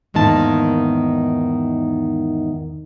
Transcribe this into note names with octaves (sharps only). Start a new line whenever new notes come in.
E2 G#2 D#3 A#3 A5